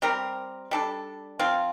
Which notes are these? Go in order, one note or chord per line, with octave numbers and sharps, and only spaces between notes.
G3 C4 G4 A#4
G3 D4 A4
F3 C4 F4